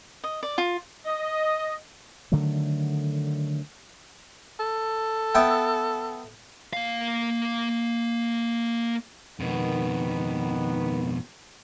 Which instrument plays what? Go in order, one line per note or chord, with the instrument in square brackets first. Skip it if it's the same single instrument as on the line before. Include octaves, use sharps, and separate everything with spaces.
[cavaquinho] D#5
D5
F4
[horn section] D#5
[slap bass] D3 D#3 F#3 A3
[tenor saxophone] A4
[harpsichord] B3 E5 G5
[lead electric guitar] A#3 F5
[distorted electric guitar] F2 B2 [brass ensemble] D#3 B3